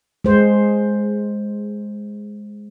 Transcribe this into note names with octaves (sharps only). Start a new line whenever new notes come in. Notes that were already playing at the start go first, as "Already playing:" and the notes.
G#3 C5